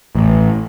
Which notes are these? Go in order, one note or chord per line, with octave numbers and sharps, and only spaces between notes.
A1